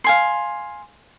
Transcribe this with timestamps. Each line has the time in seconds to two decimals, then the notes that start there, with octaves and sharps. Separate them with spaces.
0.04 F5 G#5 C6